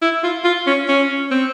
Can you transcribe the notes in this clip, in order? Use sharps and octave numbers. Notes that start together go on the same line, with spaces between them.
E4
F4
F4
C#4
C#4
C4